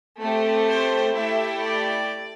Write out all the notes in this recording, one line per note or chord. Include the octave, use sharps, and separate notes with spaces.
A3 C4 G4
C5
A3 E4 G4 E5
D5